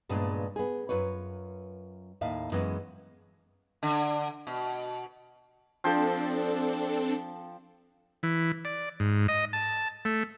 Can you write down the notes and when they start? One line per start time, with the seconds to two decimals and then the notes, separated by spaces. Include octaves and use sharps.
0.09 G2 A#2 C#3 G#3 B3 D4
0.56 B3 G#4
0.89 F#2 F4 B4 C#5
2.21 D#2 A2 E5 F5
2.52 F#2 E3 G#3 B3 C#4
3.83 D3
4.47 B2
5.84 F3 C4 D4 A4 G5
8.23 E3
8.65 D5
9.00 G#2
9.28 D#5
9.53 A5
10.05 A3